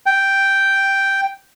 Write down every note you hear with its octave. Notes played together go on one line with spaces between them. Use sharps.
G5